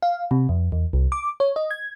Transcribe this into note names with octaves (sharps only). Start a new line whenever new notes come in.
F5
C3
F2
E2
C2
D6
C#5
D#5
G#6